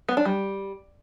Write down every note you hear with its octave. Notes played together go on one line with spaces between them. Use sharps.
B3
D4
G3